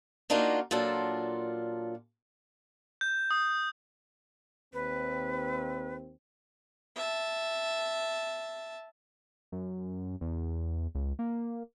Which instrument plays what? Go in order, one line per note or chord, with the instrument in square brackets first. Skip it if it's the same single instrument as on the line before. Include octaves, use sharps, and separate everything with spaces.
[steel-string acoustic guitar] A#3 D4 D#4 F4 F#4 A#4
A#2 F#3 D4 F4 A4 A#4
[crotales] G6
D#6
[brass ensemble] D#2 C4 [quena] B4
[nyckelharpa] E5 A5
[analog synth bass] F#2
E2
C#2
A#3